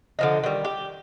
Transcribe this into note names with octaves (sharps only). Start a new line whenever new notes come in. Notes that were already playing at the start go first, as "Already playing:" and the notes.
D3 F3 D#4
D#3 G3
G4